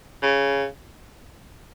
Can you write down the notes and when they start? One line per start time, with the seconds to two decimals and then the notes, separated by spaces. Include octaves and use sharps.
0.23 C#3